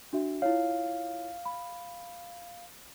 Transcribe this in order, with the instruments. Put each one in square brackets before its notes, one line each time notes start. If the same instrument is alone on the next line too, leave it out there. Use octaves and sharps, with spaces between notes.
[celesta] D4 F#4 E5
[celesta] E4 F4 C#5 [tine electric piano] F5
[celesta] B5